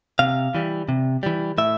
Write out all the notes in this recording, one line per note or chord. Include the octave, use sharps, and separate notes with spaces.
C3 F5
E3 G3
C3
E3 G3
A2 E5